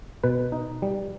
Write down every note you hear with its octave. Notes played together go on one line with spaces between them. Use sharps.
B2 B4
D#4
G3